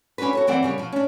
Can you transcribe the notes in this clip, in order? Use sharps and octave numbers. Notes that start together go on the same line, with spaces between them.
C#4 D4 F4 F#4 B4
F#4 A4 C#5
F#2 E3 C4 D5 F#5
F#2 C#3 G3
B2 F3
C#4 D4